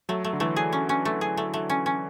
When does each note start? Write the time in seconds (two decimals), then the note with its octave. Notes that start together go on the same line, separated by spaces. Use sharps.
0.09 F#3 A3
0.24 A3
0.33 D3
0.40 E3 A3
0.56 G#4
0.73 C#4
0.89 C#4
1.05 A3
1.21 G#4
1.37 A3
1.54 A3
1.70 C#4
1.86 C#4